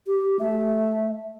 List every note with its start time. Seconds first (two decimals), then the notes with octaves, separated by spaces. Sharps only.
0.07 G4
0.40 A3 E5